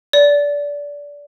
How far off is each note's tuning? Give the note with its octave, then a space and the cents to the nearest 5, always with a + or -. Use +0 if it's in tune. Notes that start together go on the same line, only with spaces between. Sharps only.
D5 -20